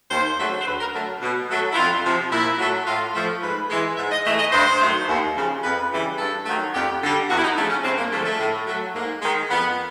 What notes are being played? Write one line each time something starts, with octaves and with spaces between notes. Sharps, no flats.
D#2 C5
C#3 F#3 A3
C5
D2 B4
A#4
D3 F#3 A3 A4
B2
F#3 A3
E4
F2 F4
C3 F3
A#2 E4
F#3 A3
A2 F4
F3 A3
G#2 B4
E3 G#3
G#2 E5
D#5
E3 A3 D#5
D#5
G2 C5
D#3 F#3 A3
D#2
C#3 F3
F2 B4
C#3 E3 G3
G2 A4
D#3 F#3 A3
F2 G4
D3 G3
E2 F#4
E4
D#4
C#3 F3 A3 D4
C#4
G2 C4
A#3
D3 F3 G#3 A3
A3
A2
F#3 A3
G#2 A#3
D#3 G#3
F2 B3